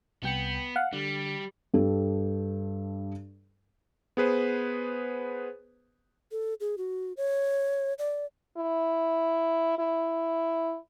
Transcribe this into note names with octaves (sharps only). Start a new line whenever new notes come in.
C2 B3 G5 C#7
F5 F#5
D3 G3
G2 G4 A4
B3 G#4 B4 C5
A4
G#4
F#4
C#5
D5
E4
E4